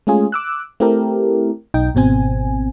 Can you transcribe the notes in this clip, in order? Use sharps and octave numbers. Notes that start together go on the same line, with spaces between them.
G#3 A3 C#4 F4 G#4
D6 E6 F#6
A3 C4 E4 G4 A4 A#4
B1 D#4 G5
G#1 B2 C4 G#5